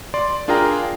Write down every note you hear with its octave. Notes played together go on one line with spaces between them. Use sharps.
D5 C6
D4 F4 G#4 A#4 G5 A#5